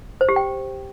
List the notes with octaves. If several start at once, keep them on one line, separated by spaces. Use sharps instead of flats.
C5
G4
G5